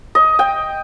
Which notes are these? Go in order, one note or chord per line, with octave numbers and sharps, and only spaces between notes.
D#5
G5